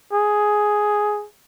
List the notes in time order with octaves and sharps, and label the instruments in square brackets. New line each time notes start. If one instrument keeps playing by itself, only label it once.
[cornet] G#4